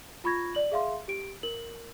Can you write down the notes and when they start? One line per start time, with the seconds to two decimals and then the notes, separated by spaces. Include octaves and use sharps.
0.24 F4 B5 C#6 G#6 A#6
0.55 D5 F#7
0.72 G#4 E5 F5 C6
1.08 G4 D7
1.43 A#4 F#7